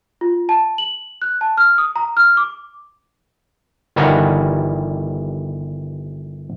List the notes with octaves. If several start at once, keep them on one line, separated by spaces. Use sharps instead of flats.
F4
A5
F#7
F#6
A5
F6
D#6
A#5
F6
D6
G1 D#3 E3 G3 F#5 A#5